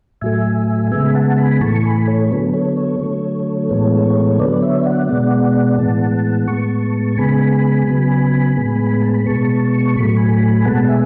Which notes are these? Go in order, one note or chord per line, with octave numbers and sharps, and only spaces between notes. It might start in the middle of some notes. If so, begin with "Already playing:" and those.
A2 F#3 A3 E5 G#5
C#3 G#3 B3 E5 G#5
B5
F#5 A5
G#5 B5
A2 E3 A3 A5 C#6
G#5 B5
A4 C#5
D3 F#3 B3 A4
A4 C#5
A4 C#5
D3 F#3 A3 A4 C#5
A2 E3 G#3 B3
D3 F#3 B3 B4 D5
C#5 E5
D5 F#5
B2 G#3 B3 D5 F#5
A2 E3 G#3 B3 F#5 A5
A2 G#3 B3 A5 C#6
C#3 G#3 B3 G#5 B5
G#5 B5
C#3 F#3 B3 G#5 B5
A2 G#3 B3
G#5
A5
B5
B2 G#3 B3 A5 C#6
A2 F#3 A3 B5
C#6
G#5 B5
B2 G#3 B3 F#5 A5
E5 G#5